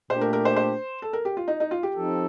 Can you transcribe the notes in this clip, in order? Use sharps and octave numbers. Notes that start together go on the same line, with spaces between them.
A#2 A3 D4 G4 C5
A#4
A#4
C5
C5
A4
A#4
G4
F4
D#4
D#4
F4
G4
F3 C4 D#4 A4